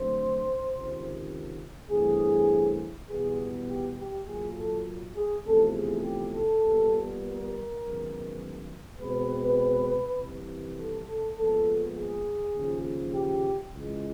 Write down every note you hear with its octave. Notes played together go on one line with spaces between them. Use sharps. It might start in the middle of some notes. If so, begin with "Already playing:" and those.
Already playing: D2 D3 F#3 A3 C4 C5
C#2 C3 D#3
G2 E3 A3 C4 G#4
E2 B2 G3 B3 G#4
G4
G4
A#2 F#3 A#3 G#4
A4
G#4
E2 C3 F3 A3 A4
G#4
G4
A4
A#2 G3 B3
A#4
F#2 D#3 G#3 B3
B2 G#3 C4 B4
C2 C3 E3
A4
A4
A#2 F3 G#3 B3 A4
G#4
D#2 C#3 F3
G4
C#2 C#3 E3 G#3